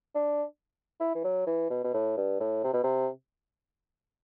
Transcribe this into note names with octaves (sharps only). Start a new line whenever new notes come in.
D4
E4
E3
F#3
E3
B2
B2
A2
G2
A2
C3
B2
C3